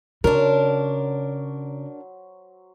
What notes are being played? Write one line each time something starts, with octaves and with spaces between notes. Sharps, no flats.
C#3 F#3 D4 F#4 A#4 C5